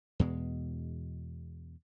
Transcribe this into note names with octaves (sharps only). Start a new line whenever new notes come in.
E2 B2 G#3